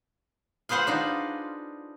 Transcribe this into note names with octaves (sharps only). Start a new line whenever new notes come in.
F4 G#4 B4 C5 F#5
D4 D#4 F4